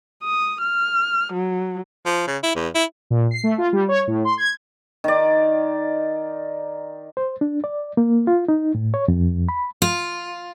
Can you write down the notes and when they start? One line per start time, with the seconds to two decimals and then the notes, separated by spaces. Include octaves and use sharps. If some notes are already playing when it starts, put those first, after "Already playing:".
0.23 D#6
0.62 F6
1.34 F#3
2.06 F3
2.27 C#3
2.43 E4
2.56 E2
2.75 E4
3.10 A#2
3.31 C7
3.44 A3
3.58 F4
3.73 G3
3.88 C#5
4.07 A2
4.25 C6
4.38 G#6
5.04 D#3 D5
7.17 C5
7.41 D4
7.64 D5
7.97 A#3
8.27 F4
8.48 D#4
8.75 A2
8.94 C#5
9.08 F2
9.49 B5
9.82 F4